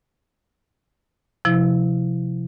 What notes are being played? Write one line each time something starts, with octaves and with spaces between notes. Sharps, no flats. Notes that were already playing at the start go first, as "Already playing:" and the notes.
C3 F3 E4